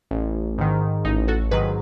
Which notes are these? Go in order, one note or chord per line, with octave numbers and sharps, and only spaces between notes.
A1
G#2 D#3
A1 D#4
F#4 A4
G#2 D#3 F#3 G#4 B4